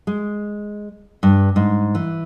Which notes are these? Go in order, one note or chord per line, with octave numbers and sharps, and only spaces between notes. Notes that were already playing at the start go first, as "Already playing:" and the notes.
G#3
G2
G#2
E3